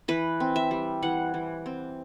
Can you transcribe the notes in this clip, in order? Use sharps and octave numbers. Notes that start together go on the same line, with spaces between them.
E3 B4
C4
E5
G3
E3 F#5
E3
C4